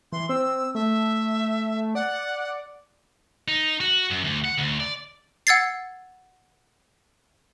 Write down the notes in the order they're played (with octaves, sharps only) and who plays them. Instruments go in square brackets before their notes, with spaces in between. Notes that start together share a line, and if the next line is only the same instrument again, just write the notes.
[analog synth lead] E3 [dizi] C6
[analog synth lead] C4 [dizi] E6
[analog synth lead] A3 [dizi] E5
[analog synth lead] D5 [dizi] F#5
[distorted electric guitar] D#4
F#4
F#2
D2
F#5
D2
D5
[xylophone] F#5 E6 G#6 A6 C7